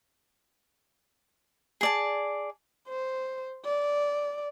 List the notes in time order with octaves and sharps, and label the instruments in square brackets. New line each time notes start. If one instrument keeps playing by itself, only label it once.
[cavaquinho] G#4 D5 A5
[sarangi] C5
D5